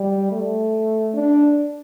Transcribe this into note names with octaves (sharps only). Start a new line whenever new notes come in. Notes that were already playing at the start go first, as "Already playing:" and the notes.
Already playing: G3
A3
D4